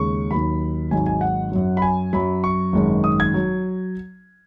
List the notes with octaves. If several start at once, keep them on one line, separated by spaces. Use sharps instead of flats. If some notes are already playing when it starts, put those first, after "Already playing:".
Already playing: D#2 C#3 G#3 C#6
D#2 D#3 F#3 B5
G#1 G#2 F#3 G#5
G#5
F#5
F#2 F#3
B5
G#5
F#2 F#3 B5
C#6
G#1 F#2 D#3 G#3
D#6
G#6
F#3